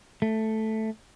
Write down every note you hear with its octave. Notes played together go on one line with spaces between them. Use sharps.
A3